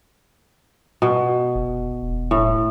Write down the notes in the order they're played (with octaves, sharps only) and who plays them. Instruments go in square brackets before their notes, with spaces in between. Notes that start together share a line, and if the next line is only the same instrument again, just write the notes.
[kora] B2
[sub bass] F1
E1
[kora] A2